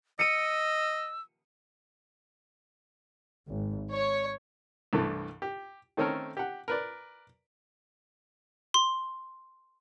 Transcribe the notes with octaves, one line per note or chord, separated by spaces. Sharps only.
D#5 E6 C#7 D#7
G#1
C#5
C2 G2 E3 A3
G4
D#3 A3 C4 C#4 A4 A#4
G4 F#5
A#4 B4 D5
C6